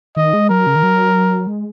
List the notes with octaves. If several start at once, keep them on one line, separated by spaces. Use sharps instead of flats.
D#3 D#5
G#3
F#3 A#4
C#3
D#3
F#3
G#3